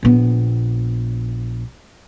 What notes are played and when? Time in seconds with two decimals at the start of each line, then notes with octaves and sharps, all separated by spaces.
0.03 A#1 B3